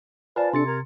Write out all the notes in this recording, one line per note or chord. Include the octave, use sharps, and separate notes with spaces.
F4 B4 C5 D5 F5 G#5 A5
C3 D4 A4 C6 A6 C#7
A#4 A#5 G#6